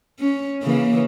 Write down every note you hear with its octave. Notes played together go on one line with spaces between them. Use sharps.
C#4
C#3 E3 A#3